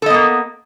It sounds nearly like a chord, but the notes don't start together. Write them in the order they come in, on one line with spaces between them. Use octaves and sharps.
A4 D#5 B3 A#3